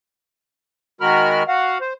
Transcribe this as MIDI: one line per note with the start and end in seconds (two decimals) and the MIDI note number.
1.01 1.43 51
1.01 1.43 56
1.01 1.43 66
1.01 1.43 70
1.01 1.43 83
1.01 1.43 89
1.48 1.78 66
1.48 1.78 77
1.48 1.78 78
1.81 1.93 72